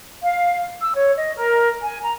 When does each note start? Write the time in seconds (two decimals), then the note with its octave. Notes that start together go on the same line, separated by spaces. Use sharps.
0.22 F5
0.82 E6
0.94 C#5
1.16 D#5
1.37 A#4
1.82 G#5
2.02 A#5